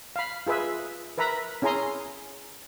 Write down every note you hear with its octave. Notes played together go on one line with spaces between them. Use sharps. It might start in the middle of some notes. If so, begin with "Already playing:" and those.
F5 B5
F4 G#4 B4 E5
A#4 B4 E5 A#5 B5
C#4 E4 G#4 G#5 A#5 C6